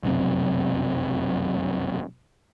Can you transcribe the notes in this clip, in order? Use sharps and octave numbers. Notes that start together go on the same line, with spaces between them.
F1 B1 F#2 C3